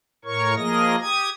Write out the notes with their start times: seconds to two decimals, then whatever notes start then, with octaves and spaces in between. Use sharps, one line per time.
0.25 A2 A#4 C#5 C#6
0.56 F3 A#3 G#4 A#4 D#5 A#6
1.00 G4 D#6 G#6